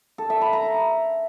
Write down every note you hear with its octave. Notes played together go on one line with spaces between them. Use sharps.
A4
E5
B5
A#5